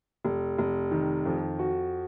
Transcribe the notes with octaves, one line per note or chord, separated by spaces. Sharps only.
F1
F1
D#3
F2
F#4